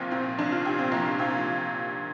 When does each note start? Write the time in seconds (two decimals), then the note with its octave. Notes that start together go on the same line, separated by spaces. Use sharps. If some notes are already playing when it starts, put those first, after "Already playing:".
Already playing: A#1 A#2 C4 F4
0.11 A#2 C4
0.39 A#1 D4
0.52 F4
0.65 A#2 G4
0.79 C4
0.92 A#1 A#3
1.18 A#2 C4